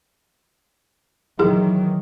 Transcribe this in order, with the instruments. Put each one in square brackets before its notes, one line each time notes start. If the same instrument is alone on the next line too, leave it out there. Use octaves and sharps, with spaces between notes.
[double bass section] D#3 E3 F#3 [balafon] E4 G#4